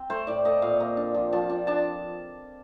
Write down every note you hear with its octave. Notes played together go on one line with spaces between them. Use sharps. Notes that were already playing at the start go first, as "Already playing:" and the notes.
Already playing: C4 G5
A3 C5
A2 D5
A3 D#5
A#2 F5
A#3
D4
F3
F3 A5
D4
D4 A5